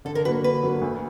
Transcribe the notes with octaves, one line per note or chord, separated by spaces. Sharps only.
D3 A4
A#4
F#3 A#3 B4
D3 B4
F#3 A#3
D2